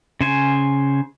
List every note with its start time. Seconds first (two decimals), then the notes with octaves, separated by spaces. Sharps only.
0.21 C#3 C5 G#5